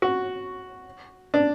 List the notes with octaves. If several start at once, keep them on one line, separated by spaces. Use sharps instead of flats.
F#4
D4